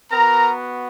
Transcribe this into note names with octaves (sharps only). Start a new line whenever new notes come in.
B3 F#4 A#4 A#5